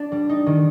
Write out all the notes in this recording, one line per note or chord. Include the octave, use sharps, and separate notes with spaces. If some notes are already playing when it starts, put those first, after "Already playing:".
Already playing: D4
G3
D#4
D#3